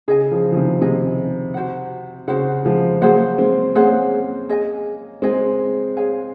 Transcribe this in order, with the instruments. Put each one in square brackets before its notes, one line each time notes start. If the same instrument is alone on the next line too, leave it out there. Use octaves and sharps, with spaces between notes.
[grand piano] C#3 [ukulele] G#4 D#5 G#5
[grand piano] C#3 F3
F3
C3 D#3
[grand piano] C3 [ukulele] G#4 D#5 G#5
[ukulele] F#4 C5 F#5
[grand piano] C#3 [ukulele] F#4 C5 F#5
[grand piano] F3 G#3
[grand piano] F#3 A#3 [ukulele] G#4 C5 F#5
[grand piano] G#3 C4
[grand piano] A#3 C#4 [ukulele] G#4 C5 F#5
[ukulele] G#4 D#5 G#5
[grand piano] G#3 C4 [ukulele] G#4 D#5 G#5
[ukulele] G#4 C#5 F5 G#5